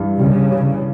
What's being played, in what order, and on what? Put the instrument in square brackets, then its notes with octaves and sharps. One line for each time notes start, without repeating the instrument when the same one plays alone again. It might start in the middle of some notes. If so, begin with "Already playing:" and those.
Already playing: [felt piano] G2 E3
[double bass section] C#3 [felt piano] G3
[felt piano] G3